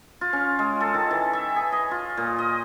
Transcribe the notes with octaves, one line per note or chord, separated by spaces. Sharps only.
F4
C#4
G#3
A4
D#3
E3
E5
G#4
D#5
F4
A#2
D#5